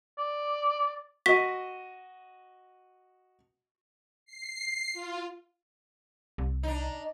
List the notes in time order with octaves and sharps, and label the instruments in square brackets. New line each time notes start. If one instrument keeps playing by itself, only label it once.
[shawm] D5
[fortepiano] F#4 D#5 [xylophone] B6
[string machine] C7
F4
[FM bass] C2
[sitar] D4 D#4